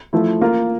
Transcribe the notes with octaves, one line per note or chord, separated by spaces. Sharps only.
F3 A3 E4
A#3 F4 A#4